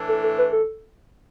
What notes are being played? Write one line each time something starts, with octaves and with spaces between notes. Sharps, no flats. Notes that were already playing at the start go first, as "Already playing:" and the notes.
Already playing: A2 E3 A3 D4
A4
A4
B4
A4